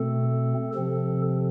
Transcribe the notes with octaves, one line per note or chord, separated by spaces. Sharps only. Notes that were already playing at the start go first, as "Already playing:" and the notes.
Already playing: B2 A3 C4 A4
C3 F3 C4 A4